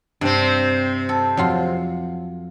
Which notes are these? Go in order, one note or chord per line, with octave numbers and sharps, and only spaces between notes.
G2 C3 C4
A4
F2 F#3 F4